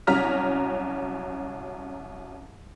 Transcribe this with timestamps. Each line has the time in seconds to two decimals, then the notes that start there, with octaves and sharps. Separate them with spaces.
0.07 C2 F#3 C#4 A#5 F6 B6